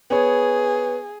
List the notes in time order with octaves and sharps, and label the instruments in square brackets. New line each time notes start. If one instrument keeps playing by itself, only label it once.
[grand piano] B3 C#5 [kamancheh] G#4